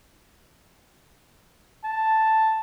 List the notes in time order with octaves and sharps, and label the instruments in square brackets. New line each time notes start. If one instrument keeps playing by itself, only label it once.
[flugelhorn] A5